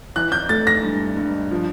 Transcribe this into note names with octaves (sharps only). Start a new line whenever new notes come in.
E3 F#6
G6
A3 A6
A#6
G2
G2
F3